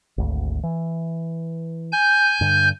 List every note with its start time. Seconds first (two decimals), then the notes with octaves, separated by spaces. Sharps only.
0.18 G#1 D2
0.63 E3
1.92 G#5 G6
2.41 G2 D3